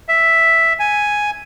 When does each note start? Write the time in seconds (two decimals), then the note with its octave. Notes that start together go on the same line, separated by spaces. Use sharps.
0.09 E5
0.79 G#5